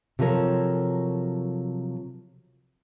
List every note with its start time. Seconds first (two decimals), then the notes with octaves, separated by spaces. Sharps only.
0.19 C3 F3 F#3 A4 A#4 C#5